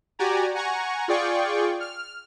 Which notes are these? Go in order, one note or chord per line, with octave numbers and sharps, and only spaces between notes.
F#4 G4 D5 G#5 A#5
F#5 G#5 A#5 C#6
F4 G#4 D5 G5 C#6
F6